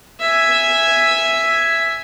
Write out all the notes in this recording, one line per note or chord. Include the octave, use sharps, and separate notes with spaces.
E5 G#5